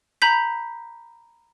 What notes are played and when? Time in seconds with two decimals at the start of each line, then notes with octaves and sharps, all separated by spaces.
0.22 A#5 B5 G6 B6